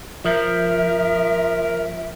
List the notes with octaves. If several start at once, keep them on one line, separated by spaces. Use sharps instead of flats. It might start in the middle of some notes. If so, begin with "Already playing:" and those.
F3 A#4 E5